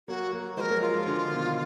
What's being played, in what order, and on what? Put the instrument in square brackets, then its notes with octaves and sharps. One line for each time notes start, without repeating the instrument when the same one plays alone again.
[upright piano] F#3 A#3 [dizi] F#4
[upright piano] F#3 A#3
[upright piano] F3 G#3 [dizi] A#4 C5
[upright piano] F#3 A#3
[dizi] F4
[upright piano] F3 G#3
D3 F3
B2 D#3